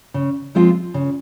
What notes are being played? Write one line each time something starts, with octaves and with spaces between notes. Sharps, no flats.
C#3
F3 G#3 C4 F4
C#3